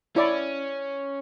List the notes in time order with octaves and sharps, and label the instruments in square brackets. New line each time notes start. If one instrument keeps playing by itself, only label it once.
[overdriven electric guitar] C#4 [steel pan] E4 D5